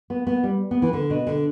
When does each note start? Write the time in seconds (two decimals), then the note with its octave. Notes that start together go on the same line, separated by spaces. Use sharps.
0.10 B3
0.27 B3
0.43 G3
0.71 B3
0.82 E3
0.93 D3
1.10 B2
1.27 D3